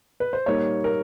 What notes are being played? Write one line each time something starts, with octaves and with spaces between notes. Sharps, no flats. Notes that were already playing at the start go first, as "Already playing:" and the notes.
B4
C5
A#2 G3 A#3 D#4 C#5
A#4